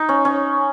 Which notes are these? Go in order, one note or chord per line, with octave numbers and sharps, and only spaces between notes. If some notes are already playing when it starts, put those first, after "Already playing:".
Already playing: D#4
C#4
C#4